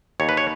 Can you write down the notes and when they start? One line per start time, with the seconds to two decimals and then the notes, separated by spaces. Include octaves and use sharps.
0.20 D#2 C#5
0.29 B4
0.37 C#5